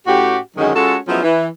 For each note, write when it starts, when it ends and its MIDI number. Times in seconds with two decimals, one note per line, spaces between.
0.07 0.38 45
0.07 0.38 61
0.07 0.38 66
0.07 0.38 67
0.57 0.71 42
0.57 0.71 50
0.57 0.71 51
0.57 0.71 54
0.57 0.71 56
0.75 0.97 56
0.75 0.97 61
0.75 0.97 65
0.75 0.97 66
0.75 0.97 69
1.07 1.21 53
1.07 1.21 54
1.07 1.21 56
1.07 1.21 59
1.07 1.21 61
1.07 1.21 64
1.23 1.47 52